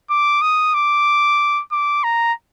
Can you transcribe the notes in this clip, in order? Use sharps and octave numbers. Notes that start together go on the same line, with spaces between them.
D6
D#6
D6
D6
A#5